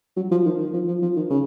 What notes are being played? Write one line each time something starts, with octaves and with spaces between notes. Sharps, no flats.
F#3
F3
D#3
D#3
F3
F3
F3
D#3
C#3